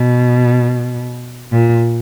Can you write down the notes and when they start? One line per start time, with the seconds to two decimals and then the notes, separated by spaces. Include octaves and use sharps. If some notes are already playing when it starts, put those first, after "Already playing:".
Already playing: B2
1.52 A#2